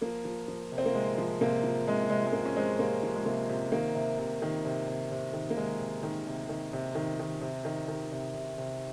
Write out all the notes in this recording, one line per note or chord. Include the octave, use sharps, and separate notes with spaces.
F3 A#3
F3
F3
C3
C4
A#3
C3 G#3
F3
C3 A#3
F3
C3 G#3
C3 G#3
G#3
C3 A#3
C#4
F3 G#3 C4
C3 A#3
F3
G#3
C3 A#3
C3
D#3 A#3
C3
C3
D#3
C3
C3
C3
D#3
A#3
D#3 G#3
C3
D#3
C3
D#3
C3
D#3
D#3
C3
D#3
D#3
C3
C3
C3